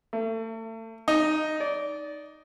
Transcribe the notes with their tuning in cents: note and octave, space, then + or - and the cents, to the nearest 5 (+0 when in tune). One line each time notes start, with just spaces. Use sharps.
A3 +35
D#4 -10
D5 -25